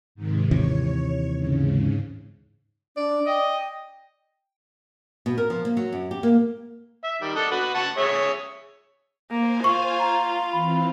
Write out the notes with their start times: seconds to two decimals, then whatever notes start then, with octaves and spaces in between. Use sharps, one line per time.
0.15 G#2 C3 D#3
0.51 D#2 C3 E3 C#5
1.38 G#2 C#3
2.97 D4 D5
3.27 D#5 G5
5.26 B2
5.38 A#4
5.50 F3
5.65 A#3
5.77 F#3
5.93 F#2
6.11 G4
6.23 A#3
7.04 E5
7.21 D#3 G3
7.35 D4 A4 D#5
7.51 F#4 B4
7.75 F#5 A5 C#6
7.97 G#4 C#5 E5
9.31 A#3 C5 G#5
9.64 F4 C#6
9.99 A#5
10.52 E3 C4 B5